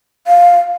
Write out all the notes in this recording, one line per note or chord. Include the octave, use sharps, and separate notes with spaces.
F5